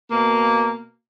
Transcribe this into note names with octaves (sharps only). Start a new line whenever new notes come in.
B2 A#3